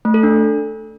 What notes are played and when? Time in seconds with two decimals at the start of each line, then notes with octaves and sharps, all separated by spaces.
0.05 A3
0.14 A4
0.23 D4